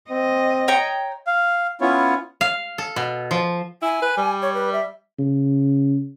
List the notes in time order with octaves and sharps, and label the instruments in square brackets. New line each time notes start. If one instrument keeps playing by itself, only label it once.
[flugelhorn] C4 [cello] D#5
[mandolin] C#5 G5 A#5
[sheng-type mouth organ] F5
B3 C#4 E4 F4 C#5
[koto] F5
A4
B2
F3
[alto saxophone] E4 [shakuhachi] G#5
[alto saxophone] B4
G3
[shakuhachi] C#5
B4
E5
[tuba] C#3